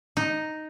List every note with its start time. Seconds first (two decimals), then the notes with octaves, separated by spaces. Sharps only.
0.17 D#4